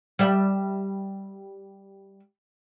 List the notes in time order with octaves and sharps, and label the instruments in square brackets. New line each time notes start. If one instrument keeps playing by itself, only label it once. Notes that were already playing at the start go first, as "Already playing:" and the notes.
[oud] G3 D5 E5